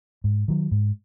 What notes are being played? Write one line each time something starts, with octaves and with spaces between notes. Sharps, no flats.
G#2
D#3 F#3
G#2